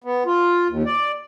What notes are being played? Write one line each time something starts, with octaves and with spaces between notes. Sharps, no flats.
B3
F4
D#2
D5